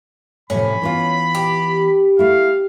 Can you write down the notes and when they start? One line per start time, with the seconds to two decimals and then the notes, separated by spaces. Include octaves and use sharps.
0.50 A2 C3 F3 C#4 B5
0.81 E3 B3 F4
1.35 G4
2.19 A3 E4 F5